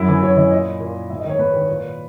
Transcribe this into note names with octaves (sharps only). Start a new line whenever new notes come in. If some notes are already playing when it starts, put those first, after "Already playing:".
Already playing: F#2 E4
E3
F#2 C#5
E3 D#5
A#2 D#5
A#2
G#2 E5
D#5
D#3
C#5
G#2 B4
D#3
A#2